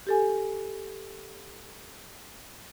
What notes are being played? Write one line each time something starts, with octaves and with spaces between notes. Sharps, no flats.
G4 A4 G#5